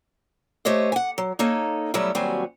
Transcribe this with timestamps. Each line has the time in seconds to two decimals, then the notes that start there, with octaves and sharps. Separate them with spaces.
0.65 A3 G4 C5 C#5 D#5
0.92 F#5 G#5
1.18 F#3
1.39 A#3 D#4 A4 C#5 D#5
1.94 B2 F#3 G3 A3 E4
2.15 D#2 F#3 G3 C4 F#4 G#5